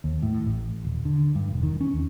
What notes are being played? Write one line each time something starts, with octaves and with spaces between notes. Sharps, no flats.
D#2
A2
A1
D#1
D3
G2
E1
D#3
C#4
D#2